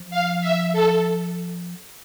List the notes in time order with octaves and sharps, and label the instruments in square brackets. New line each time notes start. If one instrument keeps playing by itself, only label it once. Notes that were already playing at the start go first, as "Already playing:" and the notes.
Already playing: [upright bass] F3
[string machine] F5
E5
A4